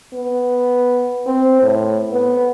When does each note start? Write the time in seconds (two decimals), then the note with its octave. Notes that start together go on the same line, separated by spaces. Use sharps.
0.13 B3
1.27 C4
1.62 A2
2.12 B3